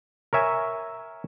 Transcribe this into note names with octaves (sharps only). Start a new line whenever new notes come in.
A#4 C#5 E5 G#5